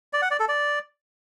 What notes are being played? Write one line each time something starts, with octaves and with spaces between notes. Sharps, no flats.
D5
F#5
D5
A4
D5